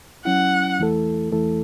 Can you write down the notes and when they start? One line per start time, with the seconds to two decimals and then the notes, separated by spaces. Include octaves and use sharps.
0.25 F#3 C#4 E4 F#5
0.79 E2 E3 A3 E4 A4
1.32 E2 E3 A3 E4 A4